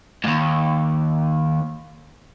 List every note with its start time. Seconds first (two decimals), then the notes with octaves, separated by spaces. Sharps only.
0.24 D#2 G#2